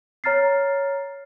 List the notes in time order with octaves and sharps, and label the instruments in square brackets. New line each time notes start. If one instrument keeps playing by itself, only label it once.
[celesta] C#5 A#5 F6 A6 C7